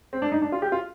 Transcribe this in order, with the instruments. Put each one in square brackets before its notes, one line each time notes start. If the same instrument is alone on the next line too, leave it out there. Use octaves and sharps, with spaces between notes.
[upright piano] C4
D4
D#4
D4
F4
G4
F4